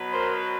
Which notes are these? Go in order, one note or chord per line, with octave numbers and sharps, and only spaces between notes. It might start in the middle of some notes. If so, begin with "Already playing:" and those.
Already playing: B2 F#3 B3
A#4 C5